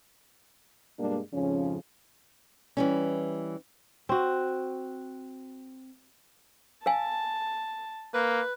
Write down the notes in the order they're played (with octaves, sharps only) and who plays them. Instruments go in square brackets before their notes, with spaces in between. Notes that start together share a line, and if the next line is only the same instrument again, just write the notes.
[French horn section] G2 B2 G3 G#3 A#3 D4
F2 G#2 C#3 F3 C#4
[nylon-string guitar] E3 G3 C#4
[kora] C4 F#4
[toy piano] A#4 F5 G#5 [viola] A5
[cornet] A#3 [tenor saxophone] B4